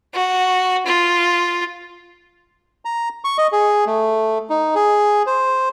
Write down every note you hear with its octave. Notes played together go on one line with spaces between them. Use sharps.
F#4
F4
A#5
C#6
D#5
G#4
A3
D#4
G#4
C5